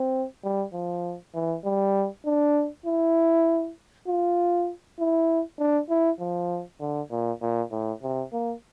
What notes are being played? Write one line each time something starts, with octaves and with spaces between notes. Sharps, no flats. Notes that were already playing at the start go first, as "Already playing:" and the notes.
Already playing: C4
G3
F3
E3
G3
D4
E4
F4
E4
D4
E4
F3
D3
A#2
A#2
A2
C3
A#3